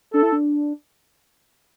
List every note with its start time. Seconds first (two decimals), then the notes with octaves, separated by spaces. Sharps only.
0.14 D4 A4
0.23 E4
0.32 D4